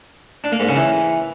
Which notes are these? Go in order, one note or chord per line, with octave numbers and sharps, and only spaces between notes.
D4
A#3
G#2
C#3
E3